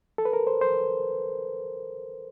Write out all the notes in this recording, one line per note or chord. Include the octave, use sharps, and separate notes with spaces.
A4
B4
A#4
C5
C5